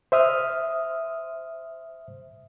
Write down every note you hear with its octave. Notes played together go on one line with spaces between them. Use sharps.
C5 E5 D#6 F6